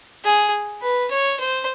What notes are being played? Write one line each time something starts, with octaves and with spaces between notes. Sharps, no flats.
G#4
B4
C#5
C5